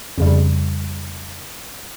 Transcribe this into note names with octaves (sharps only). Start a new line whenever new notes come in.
F2 C#3 G3